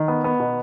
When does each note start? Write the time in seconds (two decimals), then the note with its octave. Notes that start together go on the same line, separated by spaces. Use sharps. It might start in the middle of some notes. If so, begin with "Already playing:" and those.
Already playing: D#3
0.08 B3
0.24 B3
0.40 B2